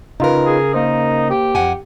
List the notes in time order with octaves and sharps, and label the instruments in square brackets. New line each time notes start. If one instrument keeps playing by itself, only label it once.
[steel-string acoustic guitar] C#3 A#4 [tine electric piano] D#4 F4 B4
[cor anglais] G#4
[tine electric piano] A#3 C5 [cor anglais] D#4
[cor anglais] G4
[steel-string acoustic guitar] F2 F#5 G#5